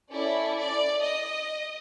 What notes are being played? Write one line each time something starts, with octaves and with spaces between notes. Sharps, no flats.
C#4 E4 A4 D5
D5
D#5